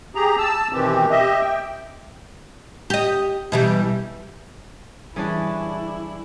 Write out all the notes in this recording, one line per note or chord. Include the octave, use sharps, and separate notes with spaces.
G4 G#4 A#5
A5 E6
B2 D#3 E3 C4 G4
G4 D#5 E5
G5
G4 D#5
B2 E3 G3
E3 G3 C#4 D4 E4 G#4